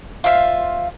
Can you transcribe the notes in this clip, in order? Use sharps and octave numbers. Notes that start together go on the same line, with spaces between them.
F4 C5 E5 F5